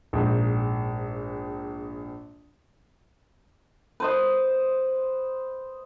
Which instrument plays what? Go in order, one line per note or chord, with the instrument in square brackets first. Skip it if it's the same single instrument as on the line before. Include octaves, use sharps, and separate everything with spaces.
[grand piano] A#1 G#2
[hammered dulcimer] B4 C5 D#5